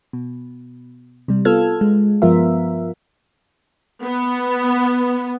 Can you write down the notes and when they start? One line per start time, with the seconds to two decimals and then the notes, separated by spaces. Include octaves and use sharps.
0.13 B2
1.28 C3 G3
1.45 B3 F4 A4 E6 F6 G#6
1.81 G#3
2.22 G2 F3 B3 F4 A#4 E5
4.03 B3